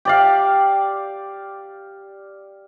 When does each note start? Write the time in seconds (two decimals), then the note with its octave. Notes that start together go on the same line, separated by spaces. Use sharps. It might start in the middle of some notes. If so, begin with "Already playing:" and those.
0.05 G4 D5 F5